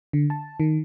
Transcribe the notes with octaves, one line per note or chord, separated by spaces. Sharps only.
D3
A5
D#3